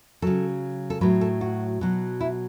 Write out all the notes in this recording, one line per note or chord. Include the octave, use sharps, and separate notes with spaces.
C#3 F#3 A4
A4
A2 F#3 B4
A4
F#4
B2 F#3
E4